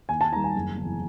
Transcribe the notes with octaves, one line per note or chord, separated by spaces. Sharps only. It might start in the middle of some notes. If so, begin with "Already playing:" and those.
D#2 G#5
A5
D#3 G3 A#5
G#5
F#1
E2 C#3